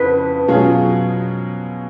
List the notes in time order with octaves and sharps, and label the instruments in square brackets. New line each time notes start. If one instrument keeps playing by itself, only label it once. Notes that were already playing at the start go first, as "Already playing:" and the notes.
Already playing: [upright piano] F2 C#3 F3 [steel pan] B4
[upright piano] B2 F#3 C#4 F4 G#4